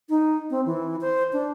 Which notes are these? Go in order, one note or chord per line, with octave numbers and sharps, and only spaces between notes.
D#4
C4
E3
C5
D4